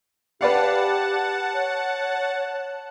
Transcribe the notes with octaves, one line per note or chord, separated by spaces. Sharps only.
G4 B4 D5 F5 F#5 A5
C#5